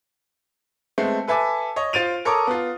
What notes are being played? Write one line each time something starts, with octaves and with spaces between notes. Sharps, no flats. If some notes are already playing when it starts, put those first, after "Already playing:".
G#3 A3 B3 C4
A4 B4 E5 G#5 A5 D6
C#5 D#5
F4 C5 A6 D7 D#7 F7
A4 A#4 C#5 A#5 D6 D#6
B3 F4